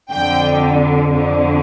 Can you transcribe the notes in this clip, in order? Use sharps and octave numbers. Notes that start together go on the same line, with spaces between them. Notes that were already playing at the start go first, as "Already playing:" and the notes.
F2 D3 G5
F2 D3